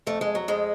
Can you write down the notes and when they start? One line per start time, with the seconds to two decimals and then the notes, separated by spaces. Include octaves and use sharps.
0.07 F2 A3
0.21 G#3
0.35 F#3
0.48 F2 G#3